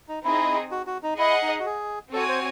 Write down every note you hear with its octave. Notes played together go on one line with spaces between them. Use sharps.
D#4
C4 D#4 E4 G#4
F#4
F#4
D#4
E4 G#4 D#5 F#5
D#4
F#4
G#4
C4 F#4 A4 C#5 G#5
C5